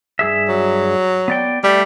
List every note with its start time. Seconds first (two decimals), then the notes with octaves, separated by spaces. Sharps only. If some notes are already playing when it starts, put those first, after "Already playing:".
0.19 G2 G#4 E5
0.49 F#3
1.28 B3 D5 G5
1.64 G3 A3